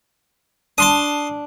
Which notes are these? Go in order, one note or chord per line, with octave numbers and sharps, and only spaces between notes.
D4 A5 C6 D#6